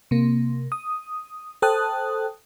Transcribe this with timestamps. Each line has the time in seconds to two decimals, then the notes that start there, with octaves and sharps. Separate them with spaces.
0.11 C3 A#3
0.72 D#6
1.62 A4 C5 G5 A5 D#6 F#6